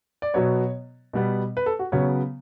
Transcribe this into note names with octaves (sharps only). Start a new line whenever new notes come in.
D5
B2 F#3 B3 C#5
B2 G3 B3
B4
A4
F#4
C#3 F#3 B3 C#5